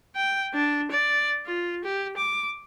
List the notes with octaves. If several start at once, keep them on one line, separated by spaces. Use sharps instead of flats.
G5
D4
D5
F4
G4
D6